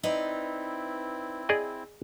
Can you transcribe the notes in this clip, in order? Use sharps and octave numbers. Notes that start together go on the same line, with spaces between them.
C4 D#4 E4 B4 D5
G#4 D5 D#5